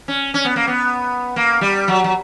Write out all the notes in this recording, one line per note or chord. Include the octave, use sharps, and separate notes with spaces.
C#4
C#4
B3
A#3
B3
A#3
G3
F#3
F#3